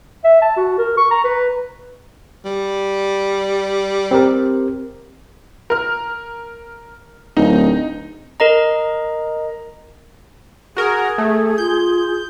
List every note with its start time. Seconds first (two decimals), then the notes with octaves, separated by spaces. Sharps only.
0.24 E5
0.42 A5
0.57 F#4
0.78 A#4
0.97 C#6
1.11 A#5
1.24 B4
2.45 G3
4.11 C4 G4 A#4
5.70 A#4 F6
7.37 D1 D#4
8.40 A#4 D#5 A#5
10.77 F#4 G#4 A#4
11.18 A3
11.58 F4 G6